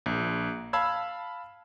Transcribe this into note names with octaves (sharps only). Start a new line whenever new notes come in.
A#1
F5 A5 B5 E6 G#6